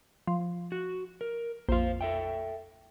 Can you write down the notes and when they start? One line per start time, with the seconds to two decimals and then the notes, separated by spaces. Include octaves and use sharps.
0.27 F3
0.72 F#4
1.21 A#4
1.69 A#1 F2 C5 F5
2.01 A4 E5 G5